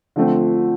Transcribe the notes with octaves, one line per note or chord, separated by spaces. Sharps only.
D3 F3 A3 C4